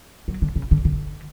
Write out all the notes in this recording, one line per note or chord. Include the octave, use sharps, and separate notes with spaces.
F#3
D3
C#3
D3
D3